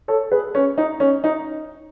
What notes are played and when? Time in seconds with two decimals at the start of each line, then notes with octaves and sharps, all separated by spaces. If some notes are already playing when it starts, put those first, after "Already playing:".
0.08 A4 C#5
0.32 G#4 B4
0.55 C#4
0.78 D#4
1.00 C#4
1.24 D#4